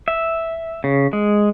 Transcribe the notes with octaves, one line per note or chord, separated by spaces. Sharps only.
E5
C#3
G#3